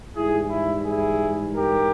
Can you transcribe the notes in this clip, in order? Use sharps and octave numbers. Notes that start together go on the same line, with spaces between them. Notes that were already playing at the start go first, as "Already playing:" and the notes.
G#2 E3 G3 E4 G#4
E4
E4 G#4
G4 A#4